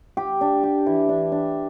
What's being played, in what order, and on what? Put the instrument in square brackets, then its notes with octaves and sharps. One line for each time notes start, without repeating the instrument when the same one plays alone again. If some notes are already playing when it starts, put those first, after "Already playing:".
[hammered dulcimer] G4
D4
G4
E3
D4
D4